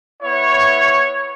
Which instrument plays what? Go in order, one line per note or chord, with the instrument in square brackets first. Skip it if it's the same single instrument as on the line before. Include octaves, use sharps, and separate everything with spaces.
[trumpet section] B3 E4 C#5